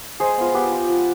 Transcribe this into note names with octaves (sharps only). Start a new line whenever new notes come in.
G#3 G#4 C5
B3 F4
B3 G4 B4
F4
F3